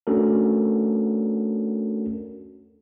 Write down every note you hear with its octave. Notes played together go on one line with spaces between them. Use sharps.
A3 C#4 D4 F#4 A4 A#4